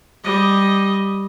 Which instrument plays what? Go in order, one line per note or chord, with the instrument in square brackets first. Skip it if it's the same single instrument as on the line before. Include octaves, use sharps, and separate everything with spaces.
[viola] G3 D#5